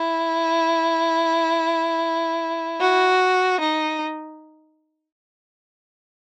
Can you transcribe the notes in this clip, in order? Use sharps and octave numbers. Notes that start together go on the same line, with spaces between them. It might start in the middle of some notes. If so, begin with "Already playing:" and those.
Already playing: E4
F#4
D#4